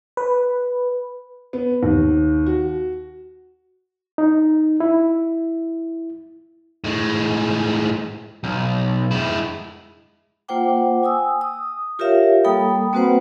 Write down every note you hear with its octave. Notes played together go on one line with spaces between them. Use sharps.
B4
B3
D#2
F#4
D#4
E4
A2 G#3
B1
G#3 E4
A#3 F4 C5 F#5 G5 D6
G#5 D#6 E6
D#6
F4 G4 A#4 C#5 E5 F5
G3 A#3 A4 G5 B5 D#6
A#3 C4 F#4 B4 C5 F#5